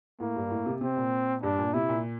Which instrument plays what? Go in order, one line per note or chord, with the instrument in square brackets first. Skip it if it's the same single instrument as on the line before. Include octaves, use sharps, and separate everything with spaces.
[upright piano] A2 [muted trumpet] A#3
[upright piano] G2
A2
C3
[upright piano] C3 [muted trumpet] C4
[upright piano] A#2
[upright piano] G2 [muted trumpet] D4
[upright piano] A#2
[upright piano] C3 [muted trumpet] E4
[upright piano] A#2